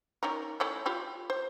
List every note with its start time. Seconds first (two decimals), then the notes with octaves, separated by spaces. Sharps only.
0.23 D#3 C#4 A#4
0.60 A3 C#4 E4
0.86 F4 G4 B5
1.30 C5